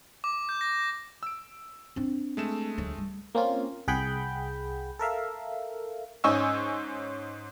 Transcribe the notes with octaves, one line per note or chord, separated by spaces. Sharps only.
D6
G6
A#6
E6 D7
C4 D4
G#3 A3 E7
D2 F#3
G3
A#3 C4 C#4 F4
C2 G#4 F#5 G5 B5 G6
A4 A#4 E5 F5
G#2 C#4 D#5 G#5 C#6 E6